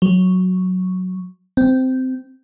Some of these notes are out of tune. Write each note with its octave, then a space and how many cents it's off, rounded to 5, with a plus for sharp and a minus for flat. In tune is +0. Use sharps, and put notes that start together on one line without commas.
F#3 -5
C4 -15